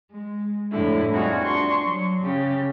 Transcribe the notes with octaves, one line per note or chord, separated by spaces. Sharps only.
G#3
F2 A2 D3 E4
G3 C4 D#4 F4 F#4 G#4
D4 C6 C#6
F#3
C#3 G4